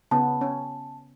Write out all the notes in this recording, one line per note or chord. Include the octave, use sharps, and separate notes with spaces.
C#3 B3 A5
C#4